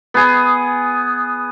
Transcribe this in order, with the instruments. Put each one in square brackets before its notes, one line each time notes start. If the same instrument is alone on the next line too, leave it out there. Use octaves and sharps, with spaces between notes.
[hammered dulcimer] B3 G#4